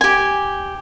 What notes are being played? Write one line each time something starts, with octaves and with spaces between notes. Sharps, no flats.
G4 G#5